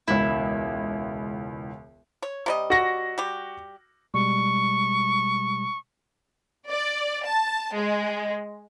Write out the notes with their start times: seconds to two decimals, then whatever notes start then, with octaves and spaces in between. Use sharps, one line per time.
0.08 E1 C#2 E4
2.22 C#5
2.46 C3 G3 D#5
2.70 F#4 A#6
3.18 G3 G4
4.14 B2 G3 G#3 C#6
6.67 D5
7.26 A5
7.74 G#3